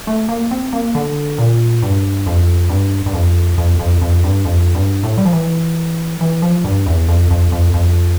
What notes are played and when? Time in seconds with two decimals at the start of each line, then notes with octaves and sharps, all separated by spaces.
0.07 A3
0.29 A#3
0.51 C4
0.73 A#3
0.95 D3
1.38 A#2
1.82 G2
2.27 F2
2.69 G2
3.06 G2
3.14 F2
3.58 F2
3.79 F2
4.02 F2
4.24 G2
4.45 F2
4.75 G2
5.03 A2
5.18 G3
5.25 F3
5.33 E3
6.21 E3
6.42 F3
6.64 G2
6.86 E2
7.08 F2
7.31 F2
7.52 F2
7.74 F2